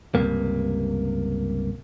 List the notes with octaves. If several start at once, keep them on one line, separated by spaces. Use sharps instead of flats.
C#2 G2 C3 A#3